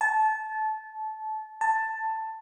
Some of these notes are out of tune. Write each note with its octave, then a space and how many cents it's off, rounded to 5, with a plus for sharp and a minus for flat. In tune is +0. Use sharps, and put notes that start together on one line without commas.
A5 -20
A5 +10